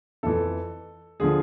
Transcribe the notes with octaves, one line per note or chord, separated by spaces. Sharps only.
F2 E3 A4
D3 F3 G#4